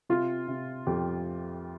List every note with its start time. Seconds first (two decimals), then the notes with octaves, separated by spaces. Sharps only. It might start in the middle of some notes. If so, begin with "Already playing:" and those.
0.09 C3 F4
0.48 C3
0.87 F2 G4